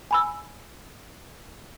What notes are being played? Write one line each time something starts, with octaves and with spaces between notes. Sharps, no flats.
G#5 B5 E6